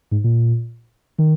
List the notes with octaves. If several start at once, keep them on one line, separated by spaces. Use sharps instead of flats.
G#2
A#2
D#3